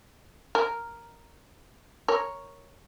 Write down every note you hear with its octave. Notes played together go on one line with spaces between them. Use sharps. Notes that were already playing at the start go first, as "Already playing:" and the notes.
A#4
A#4 C#5